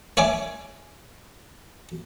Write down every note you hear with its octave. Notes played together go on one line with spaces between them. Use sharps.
C#5 D5 E5 G#5 D6